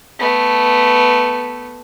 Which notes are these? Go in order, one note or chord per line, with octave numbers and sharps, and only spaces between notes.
A3 B3